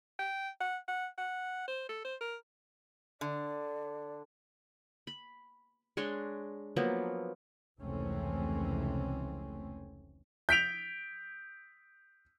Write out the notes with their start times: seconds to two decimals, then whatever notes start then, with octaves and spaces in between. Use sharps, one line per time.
0.19 G5
0.61 F#5
0.88 F#5
1.18 F#5
1.68 C5
1.89 A4
2.05 C5
2.21 A#4
3.21 D3 D5
5.07 B5
5.97 G#3 D4 C#5 C6
6.76 F3 F#3 A#3 B3
7.80 F1 C#2 E3 A3 C4 C#4
10.49 G6 B6 D7 F7